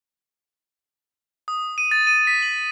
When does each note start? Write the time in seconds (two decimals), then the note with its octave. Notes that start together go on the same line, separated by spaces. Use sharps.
1.48 D#6
1.78 D#7
1.91 A6
2.07 D#7
2.27 B6
2.42 F#7